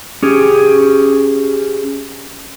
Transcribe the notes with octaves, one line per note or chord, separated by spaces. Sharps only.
C#4 G4 G#4